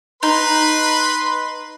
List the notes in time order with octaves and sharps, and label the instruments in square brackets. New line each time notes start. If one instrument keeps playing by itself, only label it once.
[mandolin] D#4 [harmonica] B4 B5 C6